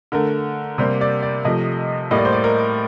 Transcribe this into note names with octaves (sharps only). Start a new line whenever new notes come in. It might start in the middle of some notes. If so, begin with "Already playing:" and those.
D3 A3 A#4
C3 G3 A#3 C5
D5
D5
C3 F3 A3 D#5
A2 G3 A#3 D#5
D5
C5
D5
A#4